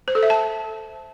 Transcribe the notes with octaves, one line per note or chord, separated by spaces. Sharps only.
C5
A4
E5
A5